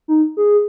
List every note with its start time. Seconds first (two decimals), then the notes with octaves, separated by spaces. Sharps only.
0.08 D#4
0.37 G#4